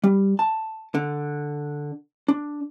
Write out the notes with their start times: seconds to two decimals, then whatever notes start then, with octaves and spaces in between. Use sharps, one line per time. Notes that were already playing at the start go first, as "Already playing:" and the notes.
0.04 G3
0.39 A5
0.95 D3
2.28 D4